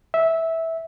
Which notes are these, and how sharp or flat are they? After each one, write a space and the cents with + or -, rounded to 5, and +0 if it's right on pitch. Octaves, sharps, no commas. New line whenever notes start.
E5 -10